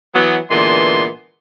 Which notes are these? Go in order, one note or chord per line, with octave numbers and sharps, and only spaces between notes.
E3 F#3 B3
A#2 D3 E3 G#3 B3 C6